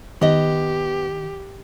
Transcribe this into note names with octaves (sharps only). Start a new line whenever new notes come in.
D#3 B3 G4 D#5